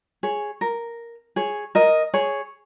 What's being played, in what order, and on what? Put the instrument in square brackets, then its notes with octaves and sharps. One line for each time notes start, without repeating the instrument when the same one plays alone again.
[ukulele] G#4 C#5
A#4
G#4 C#5
A#4 D#5
G#4 C#5